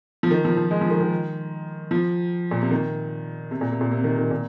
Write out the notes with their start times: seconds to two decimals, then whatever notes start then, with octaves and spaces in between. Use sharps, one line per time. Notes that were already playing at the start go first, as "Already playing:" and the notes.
0.23 F3
0.31 D#3
0.45 F3
0.57 F3
0.71 G#3
0.81 F3
0.90 D#3
1.01 D#3
1.91 F3
2.51 A#2
2.62 C3
2.71 D#3
3.51 C3
3.61 A#2
3.72 C3
3.81 A#2
3.91 C3
4.04 D#3
4.18 D#3
4.31 A#2